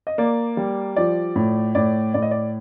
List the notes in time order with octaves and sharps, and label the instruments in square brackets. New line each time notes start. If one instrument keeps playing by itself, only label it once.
[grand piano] D#5
A#3 D5
G3
F3 D5
A2
A2 D5
A2 D5
D#5
D5